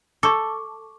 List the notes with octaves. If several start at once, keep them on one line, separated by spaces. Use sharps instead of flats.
A4 C#6 D6